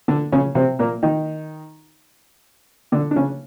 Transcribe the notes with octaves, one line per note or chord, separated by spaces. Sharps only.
D3 D4
C#3 C#4
C3 C4
A#2 A#3
D#3 D#4
D3 D4
D4
C#3 C#4